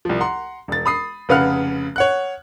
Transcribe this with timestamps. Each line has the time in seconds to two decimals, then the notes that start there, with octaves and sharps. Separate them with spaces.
0.05 C2 F3
0.20 F#5 A#5 C6
0.68 E1 A6
0.86 B5 D#6 C7
1.29 F1 C#3 B4 F5 F#5 F6
1.96 C#5 F#5 F#6